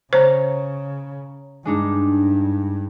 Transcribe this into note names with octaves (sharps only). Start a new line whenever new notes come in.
C#3 C5 C#5 A#5
G2 G#3 D4 D#4